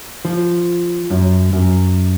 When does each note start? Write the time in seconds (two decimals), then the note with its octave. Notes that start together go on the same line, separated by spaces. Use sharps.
0.25 F3
1.10 F#2
1.53 F#2